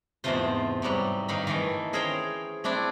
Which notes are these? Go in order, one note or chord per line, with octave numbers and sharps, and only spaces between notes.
E2 G#2 C3 A3 F4 C5
G#2 E3 F#3 G3
G2 D#3 D#4 F5 B5
D#3 E3 A3
C#4 G#4 A#4 C5 C#5 G5
A3 C4 D4 E4